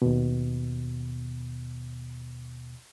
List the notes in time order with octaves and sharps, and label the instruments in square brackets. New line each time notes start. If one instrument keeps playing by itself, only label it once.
[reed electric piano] D#2 B2